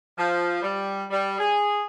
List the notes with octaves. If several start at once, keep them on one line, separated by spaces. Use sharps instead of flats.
F3
G3
G3
G#4